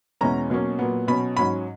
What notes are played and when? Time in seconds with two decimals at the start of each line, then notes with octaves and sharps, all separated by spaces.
0.21 E2 B2 G#3 C#4 A#5
0.50 B2 F#3 A#3 C#4
0.79 A#2 F#3 B3
1.08 B2 F#3 C#4 B5
1.37 G#2 F#3 C#4 B5